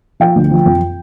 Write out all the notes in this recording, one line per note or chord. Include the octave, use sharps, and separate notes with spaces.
F3 G5
D2
F3
F2